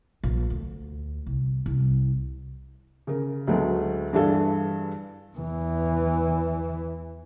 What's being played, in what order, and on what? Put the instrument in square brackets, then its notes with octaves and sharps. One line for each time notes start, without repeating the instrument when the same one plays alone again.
[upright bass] A#1
D2
C2
C2
[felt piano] C#3 A#4
D2 F#3 G#3 A3 B3
G2 E3 D4 G#4 A4 F5
[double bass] E2 E3